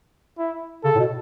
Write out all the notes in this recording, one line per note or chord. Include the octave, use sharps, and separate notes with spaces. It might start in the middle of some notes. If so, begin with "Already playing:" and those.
E4
C#3 A4
A2
B2